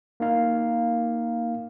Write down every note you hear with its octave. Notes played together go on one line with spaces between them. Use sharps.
A#3 D#4 F5